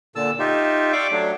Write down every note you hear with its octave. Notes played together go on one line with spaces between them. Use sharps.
A#2 D3 A5 E6
D#4 F4 G4 E5
D5 E5 F5 G5 C#6 D6
F#3 A3 D4